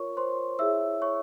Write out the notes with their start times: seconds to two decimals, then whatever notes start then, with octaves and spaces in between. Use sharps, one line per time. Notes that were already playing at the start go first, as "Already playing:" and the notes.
Already playing: F4 A#4 C#5 C#6
0.17 C5 C6
0.59 E4 G#4 C#5 E5 E6
1.02 C#5 C#6